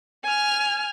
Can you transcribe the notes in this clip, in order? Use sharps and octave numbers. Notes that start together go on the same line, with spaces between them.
G#5 F6